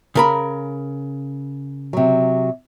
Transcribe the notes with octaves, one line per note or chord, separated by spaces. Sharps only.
C#3 A#4 B5
C3 F#3